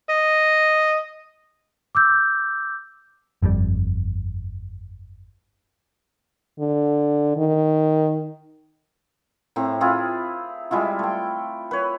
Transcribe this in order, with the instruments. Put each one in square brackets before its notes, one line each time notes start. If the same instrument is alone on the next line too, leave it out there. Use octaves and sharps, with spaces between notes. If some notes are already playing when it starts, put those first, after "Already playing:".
[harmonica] D#5
[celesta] D6 E6 G6
[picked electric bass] G1 F2 A#2 G3
[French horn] D3
D#3
[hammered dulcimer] A2 C4 A#5
C4 E4 F4 G#4
G3 G#3 E4 F4
A3 G5
B4 C#5